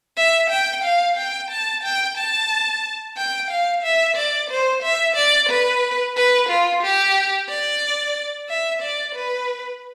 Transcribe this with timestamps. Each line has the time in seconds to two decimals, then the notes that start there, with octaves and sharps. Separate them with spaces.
0.17 E5
0.50 G5
0.84 F5
1.17 G5
1.51 A5
1.83 G5
2.17 A5
3.17 G5
3.50 F5
3.83 E5
4.17 D5
4.50 C5
4.83 E5
5.16 D5
5.49 B4
6.16 B4
6.49 F4
6.83 G4
7.49 D5
8.49 E5
8.82 D5
9.15 B4